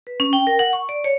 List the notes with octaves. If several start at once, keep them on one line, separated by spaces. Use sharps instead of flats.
B4
C#4
G5
A#4
F#5
C#6
D5
C#5